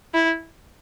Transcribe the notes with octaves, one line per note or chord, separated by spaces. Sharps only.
E4